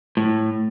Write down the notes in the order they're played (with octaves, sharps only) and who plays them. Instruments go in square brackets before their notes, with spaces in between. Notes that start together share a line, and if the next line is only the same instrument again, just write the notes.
[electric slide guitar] A2